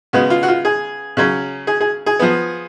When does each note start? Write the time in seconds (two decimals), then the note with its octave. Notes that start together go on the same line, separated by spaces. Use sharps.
0.13 C#3 G#3 B3 F#4
0.30 F4
0.43 F#4
0.48 F4
0.65 G#4
1.17 C#3 F#3 C#4
1.67 G#4
1.81 G#4
2.06 G#4
2.19 F3 B3